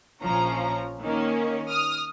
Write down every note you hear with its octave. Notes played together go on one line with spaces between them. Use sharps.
A#1 F3 C#4 A#5
D#3 A#3 C#4
D#6 F6